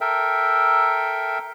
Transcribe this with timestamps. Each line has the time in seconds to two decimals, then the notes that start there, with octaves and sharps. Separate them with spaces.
0.01 A4 A#4 E5 G5